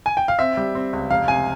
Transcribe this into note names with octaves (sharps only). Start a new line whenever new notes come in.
G#5
G5
F5
C4 E5
G3
C4
C#2
F1 F5
C3 G#5